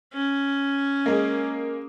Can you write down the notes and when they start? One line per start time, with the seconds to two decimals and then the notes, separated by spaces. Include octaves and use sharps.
0.12 C#4
1.06 G#3 A#3